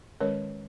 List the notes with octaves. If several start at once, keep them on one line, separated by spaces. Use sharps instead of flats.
D#3 G#3 C#4 A#4 C#5